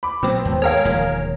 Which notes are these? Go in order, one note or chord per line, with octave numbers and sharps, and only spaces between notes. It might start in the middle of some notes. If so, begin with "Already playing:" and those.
B5 D6
A#2 F#3 B3 C4
D#2 G#2
G#4 A#4 C#5 F5
E1 D#2 F3